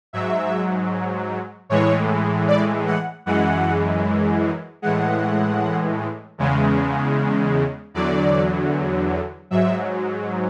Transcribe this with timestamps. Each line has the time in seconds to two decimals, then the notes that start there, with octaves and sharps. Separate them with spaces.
0.13 G#2 F#3 E5
1.69 A2 E3 G#3 C#5
2.48 D5
2.86 F#5
3.26 F#2 E3 G#3 F#5
4.82 A2 E3 G#3 F#5
6.38 E2 C#3 G#3
7.94 E2 D3 F#3 D5
9.51 G#2 F#3 E5